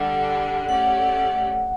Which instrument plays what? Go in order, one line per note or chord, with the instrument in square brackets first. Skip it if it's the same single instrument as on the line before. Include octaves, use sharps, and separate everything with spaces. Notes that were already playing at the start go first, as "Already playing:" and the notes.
Already playing: [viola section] D3 G3 D4 A4 [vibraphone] F#5
[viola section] A3 C#4 G4 D5 [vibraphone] F#5